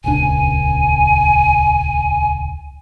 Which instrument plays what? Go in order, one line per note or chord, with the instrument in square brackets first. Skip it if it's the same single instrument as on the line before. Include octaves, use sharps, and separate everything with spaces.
[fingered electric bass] D#1 C#2 D4 [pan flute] G#5